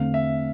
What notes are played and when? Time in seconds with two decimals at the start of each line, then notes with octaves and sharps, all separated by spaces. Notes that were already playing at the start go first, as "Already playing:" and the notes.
Already playing: E2 D3 A3 C4 F5
0.14 E5